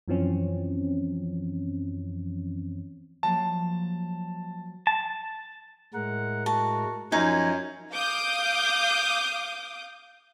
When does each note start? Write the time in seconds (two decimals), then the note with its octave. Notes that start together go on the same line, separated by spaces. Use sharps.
0.08 F#2 E3 F3 C4 C#4
3.23 F3 F#3 A#3 A5
4.87 A5
5.94 A2 G#3 A#4 F#5
6.46 F#4 A5
7.12 F#2 F3 D#4 G#5
7.92 F5 D6 D#6 G6